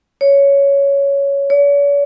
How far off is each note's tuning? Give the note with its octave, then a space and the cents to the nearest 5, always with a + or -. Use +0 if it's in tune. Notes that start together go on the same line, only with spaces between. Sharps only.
C#5 +10
C#5 +45